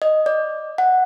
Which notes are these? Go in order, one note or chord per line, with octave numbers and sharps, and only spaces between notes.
D#5
D5
F#5